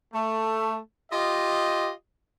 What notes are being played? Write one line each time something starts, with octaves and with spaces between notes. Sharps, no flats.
A3
F4 G4 D#5